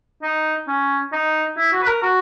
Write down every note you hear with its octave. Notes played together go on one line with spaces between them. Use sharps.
D#4
C#4
D#4
E4
F#4
B4
A#4
F#4